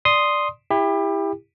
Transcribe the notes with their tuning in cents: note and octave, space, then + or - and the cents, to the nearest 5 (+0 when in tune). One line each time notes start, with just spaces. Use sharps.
D5 +5 C6 +0 D#6 +0
E4 +0 G4 +30